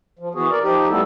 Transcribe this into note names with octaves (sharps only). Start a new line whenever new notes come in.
F3
E3 B3 F#4 G#4
A#4 D5
F3 D#4 G4
G3 A3 B3 E4 A4